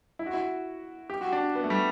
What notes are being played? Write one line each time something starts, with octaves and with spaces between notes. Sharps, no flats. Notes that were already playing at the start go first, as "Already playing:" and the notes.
E4
F#4
E4
G4
F#4
D4
B3
A3
G3